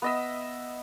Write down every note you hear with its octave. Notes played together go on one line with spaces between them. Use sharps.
B3 D#5 E5